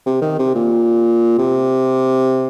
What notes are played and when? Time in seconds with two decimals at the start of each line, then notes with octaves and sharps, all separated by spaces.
0.06 C3
0.22 D#3
0.39 C3
0.55 A#2
1.38 C3